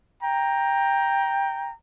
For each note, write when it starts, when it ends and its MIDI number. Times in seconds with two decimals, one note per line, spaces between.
0.23 1.71 79
0.23 1.74 82